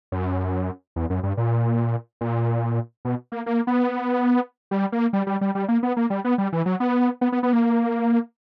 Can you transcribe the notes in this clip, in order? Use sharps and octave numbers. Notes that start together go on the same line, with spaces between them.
F#2
E2
F#2
G2
A#2
A#2
B2
A#3
A#3
B3
G3
A#3
G3
G3
G3
G3
A#3
B3
A#3
G3
B3
G3
E3
F#3
B3
B3
B3
B3
A#3